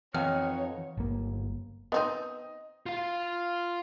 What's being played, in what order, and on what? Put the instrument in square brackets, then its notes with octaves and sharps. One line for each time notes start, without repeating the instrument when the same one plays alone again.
[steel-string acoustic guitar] F2 [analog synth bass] E3 [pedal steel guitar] D#4 F#5 F6 [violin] C#5
[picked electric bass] G1 A#3
[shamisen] B3 C4 D#4 [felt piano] D#5 D#6
[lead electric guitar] F4 F5